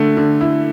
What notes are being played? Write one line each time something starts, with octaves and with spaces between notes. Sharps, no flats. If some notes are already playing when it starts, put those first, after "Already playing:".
Already playing: D3 A3
D3
E4